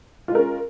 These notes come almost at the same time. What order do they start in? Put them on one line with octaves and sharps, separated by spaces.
F4 G#3 A#4 C#4